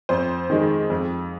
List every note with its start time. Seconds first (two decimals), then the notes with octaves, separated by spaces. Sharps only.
0.09 F2 C5
0.50 D#3 G#3
0.90 F2